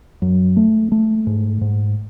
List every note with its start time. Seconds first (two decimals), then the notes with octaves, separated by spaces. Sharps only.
0.22 F#2
0.57 A3
0.92 A3
1.27 G#2
1.61 G#2